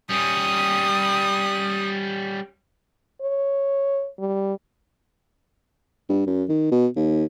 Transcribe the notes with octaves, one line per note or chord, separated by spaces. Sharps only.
G3 C#4 D#6
C#5
G3
G2
F#2
D#3
B2
D#2